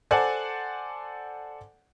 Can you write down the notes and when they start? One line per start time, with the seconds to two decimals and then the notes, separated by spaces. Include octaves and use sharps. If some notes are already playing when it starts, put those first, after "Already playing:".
0.11 A4 C5 D5 F#5 G#5 A5